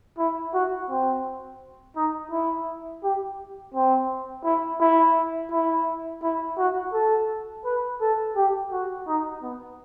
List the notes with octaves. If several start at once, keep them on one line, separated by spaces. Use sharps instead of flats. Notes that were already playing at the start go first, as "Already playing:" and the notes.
E4
F#4
C4
D#4
E4
G4
C4
E4
E4
E4
E4
F#4
A4
B4
A4
G4
F#4
D#4
B3